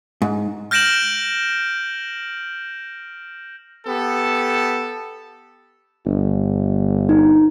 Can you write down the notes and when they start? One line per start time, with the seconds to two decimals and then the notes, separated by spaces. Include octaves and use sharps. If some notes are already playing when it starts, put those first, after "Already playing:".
0.22 G#2
0.71 F6 G6 A#6 D7 E7 F#7
3.87 B3 G4 A4
6.06 G1
7.09 D#4